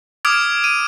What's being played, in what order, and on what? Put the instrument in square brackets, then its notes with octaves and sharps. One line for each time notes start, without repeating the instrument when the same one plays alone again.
[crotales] D6 D#6 F6 G#6 D7
D#7